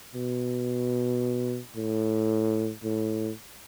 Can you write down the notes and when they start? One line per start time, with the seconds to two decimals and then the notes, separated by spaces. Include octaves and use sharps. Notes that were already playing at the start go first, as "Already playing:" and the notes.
0.15 B2
1.76 A2
2.84 A2